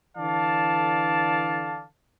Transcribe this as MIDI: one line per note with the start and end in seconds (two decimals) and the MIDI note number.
0.18 1.85 50
0.18 1.85 52
0.18 1.85 69
0.18 1.85 74
0.18 1.85 77
0.18 1.85 81